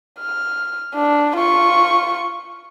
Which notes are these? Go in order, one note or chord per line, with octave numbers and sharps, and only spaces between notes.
F6
D4
F4 C#6